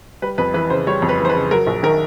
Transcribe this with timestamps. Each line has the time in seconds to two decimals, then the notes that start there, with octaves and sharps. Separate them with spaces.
0.22 G3 B4
0.38 F2 B4
0.54 E3 B4
0.70 C#3 C5
0.87 G3 C#5
1.02 F2
1.09 B4
1.20 E3
1.25 C5
1.30 B4
1.35 C#3
1.51 F#3 A#4
1.67 A#1
1.83 D#3 A#4